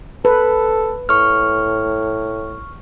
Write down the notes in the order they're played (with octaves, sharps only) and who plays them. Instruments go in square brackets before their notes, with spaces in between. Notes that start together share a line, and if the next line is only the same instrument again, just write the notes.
[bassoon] A4 [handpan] B4
[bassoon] A2 [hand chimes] C#6 F6